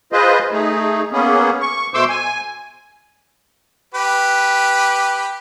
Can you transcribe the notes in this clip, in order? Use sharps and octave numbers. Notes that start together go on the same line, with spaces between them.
F4 G#4 B4 C5 D#5
A3 D#4 G#4
A#3 B3 C#4 G#4
C#6
B2 A3 C5 C6 D6 E6
G#5
G4 B4